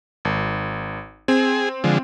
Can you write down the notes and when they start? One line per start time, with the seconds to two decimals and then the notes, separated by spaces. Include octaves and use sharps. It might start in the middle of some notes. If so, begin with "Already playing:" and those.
0.25 G#1
1.28 C4 G#4
1.84 D3 F3 G#3